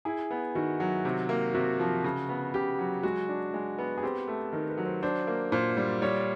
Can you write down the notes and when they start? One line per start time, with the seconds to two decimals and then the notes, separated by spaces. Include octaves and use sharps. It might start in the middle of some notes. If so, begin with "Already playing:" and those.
0.05 E4 G#4
0.31 B3
0.55 D#3 F#4
0.80 F#3
1.05 C3
1.29 A#3
1.54 C3 F#4
1.79 F3
2.04 C#3
2.29 B3
2.54 C#3 G4
2.79 F#3
3.03 G#3 F#4
3.29 D4
3.54 G#3
3.78 B3
3.98 G#4
4.03 C4 G4
4.27 A3
4.52 D#3 A#4
4.69 B4
4.78 F#3
4.86 C5
5.03 D4 C5
5.27 A#3
5.52 A#2 C5
5.77 G3
6.02 G3 C#5